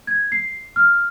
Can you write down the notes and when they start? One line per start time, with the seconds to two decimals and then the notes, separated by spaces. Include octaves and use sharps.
0.07 G#6
0.32 C7
0.76 F6